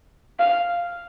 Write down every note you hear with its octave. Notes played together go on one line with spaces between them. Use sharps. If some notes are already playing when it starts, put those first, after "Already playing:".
F5